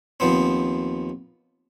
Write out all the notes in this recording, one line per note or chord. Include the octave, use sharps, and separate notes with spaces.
D#2 F3 B3 C4